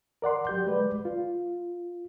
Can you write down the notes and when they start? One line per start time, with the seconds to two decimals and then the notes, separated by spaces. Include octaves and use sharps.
0.22 A#4 D5 F#5 C6
0.47 F#3 G4 G6
0.67 G#3 B4 D5
1.05 F4